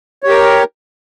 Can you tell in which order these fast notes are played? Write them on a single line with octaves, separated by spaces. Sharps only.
C#5 G4 A#4